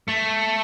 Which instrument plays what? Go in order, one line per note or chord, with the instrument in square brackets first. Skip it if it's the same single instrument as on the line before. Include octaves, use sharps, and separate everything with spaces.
[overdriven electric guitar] A3